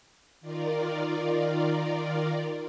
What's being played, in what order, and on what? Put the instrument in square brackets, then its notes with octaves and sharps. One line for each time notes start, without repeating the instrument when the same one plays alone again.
[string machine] D#3 F4 A#4 D5